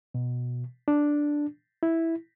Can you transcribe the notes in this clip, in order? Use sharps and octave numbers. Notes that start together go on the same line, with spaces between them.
B2
D4
E4